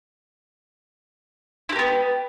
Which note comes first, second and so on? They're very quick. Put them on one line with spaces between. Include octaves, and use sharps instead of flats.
E4 G4 A#3 B3